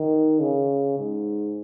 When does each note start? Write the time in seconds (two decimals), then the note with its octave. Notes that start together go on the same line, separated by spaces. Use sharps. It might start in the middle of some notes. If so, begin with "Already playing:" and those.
Already playing: D#3
0.40 C#3
0.99 G#2